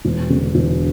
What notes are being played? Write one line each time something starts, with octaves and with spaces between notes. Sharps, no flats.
E1
D3
E1